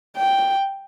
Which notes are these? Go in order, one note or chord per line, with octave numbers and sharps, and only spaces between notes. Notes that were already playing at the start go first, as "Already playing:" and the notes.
G5